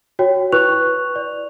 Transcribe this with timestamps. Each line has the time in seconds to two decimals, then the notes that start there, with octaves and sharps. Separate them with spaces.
0.19 F#4 C#5 G5
0.52 E4 B4 C#6 F#6 F7
1.16 D5